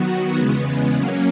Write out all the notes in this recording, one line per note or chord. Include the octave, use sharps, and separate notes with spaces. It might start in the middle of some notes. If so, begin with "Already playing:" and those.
Already playing: D#3 F#3 B3 F#4
E2 C#3 G#3 B3
F#3 A#3 C#4